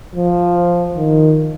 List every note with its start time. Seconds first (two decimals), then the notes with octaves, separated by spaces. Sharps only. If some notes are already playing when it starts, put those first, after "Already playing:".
0.15 F3
0.96 D#3